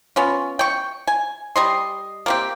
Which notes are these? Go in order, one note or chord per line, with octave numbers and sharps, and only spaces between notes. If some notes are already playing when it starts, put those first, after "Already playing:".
B3 C#4 F4
G5 C#6
G#5
G3 D#5 C6
A#3 C4 G4